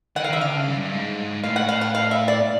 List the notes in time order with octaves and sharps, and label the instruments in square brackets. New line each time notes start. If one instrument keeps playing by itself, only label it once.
[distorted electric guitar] D#3 [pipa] F#5
[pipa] F5
[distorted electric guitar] D#3 [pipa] E5
[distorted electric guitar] D3 [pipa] F5
[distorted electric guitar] C#3
G2
G2
G#2
[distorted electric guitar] A2 [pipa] F5
[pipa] F#5
F5
F#5
F5
E5
D5